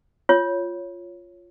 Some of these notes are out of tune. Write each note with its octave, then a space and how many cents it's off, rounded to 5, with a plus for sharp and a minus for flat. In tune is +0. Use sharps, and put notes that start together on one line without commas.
F4 +0 C#5 +0